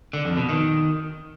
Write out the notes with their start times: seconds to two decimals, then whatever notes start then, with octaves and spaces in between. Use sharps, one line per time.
0.13 D3
0.25 F2
0.37 B2
0.49 D#3